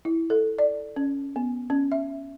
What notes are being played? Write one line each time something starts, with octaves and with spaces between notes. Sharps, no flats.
E4
A4
D5
C#4
B3
C#4
E5